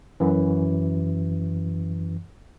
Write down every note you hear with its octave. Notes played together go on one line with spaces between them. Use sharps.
F#2 E3